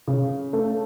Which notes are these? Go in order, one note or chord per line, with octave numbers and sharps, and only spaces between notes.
C#3
A3